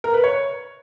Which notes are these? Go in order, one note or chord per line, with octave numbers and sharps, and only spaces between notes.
A#4
B4
C#5